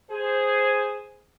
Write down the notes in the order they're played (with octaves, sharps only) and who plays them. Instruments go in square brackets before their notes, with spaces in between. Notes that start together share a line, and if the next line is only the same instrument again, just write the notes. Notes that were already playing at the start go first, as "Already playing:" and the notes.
[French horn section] G#4 C5